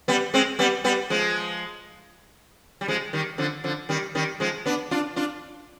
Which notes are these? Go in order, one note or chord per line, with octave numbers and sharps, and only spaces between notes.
G3 B3
G#3 C4
G3 B3
G3 B3
F3 G#3
G3
F3 G#3
D#3 G3
D3 F3
D3 F3
D#3 G3
D#3 G3
F3 G#3
B3 D4
D4 F4
D4 F4